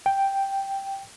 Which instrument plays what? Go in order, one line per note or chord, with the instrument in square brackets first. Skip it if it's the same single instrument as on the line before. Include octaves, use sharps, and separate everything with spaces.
[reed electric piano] G5